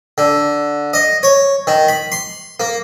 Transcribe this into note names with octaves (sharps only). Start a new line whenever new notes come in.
D3
D#5
C#5
D#3
B5
C6
A#3